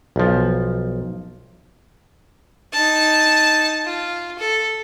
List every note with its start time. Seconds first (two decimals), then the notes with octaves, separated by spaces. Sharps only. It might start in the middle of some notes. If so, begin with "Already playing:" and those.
0.16 B1 F3
2.73 D#4 A5
3.85 F4
4.38 A4